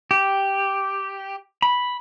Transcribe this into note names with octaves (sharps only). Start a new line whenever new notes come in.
G4
B5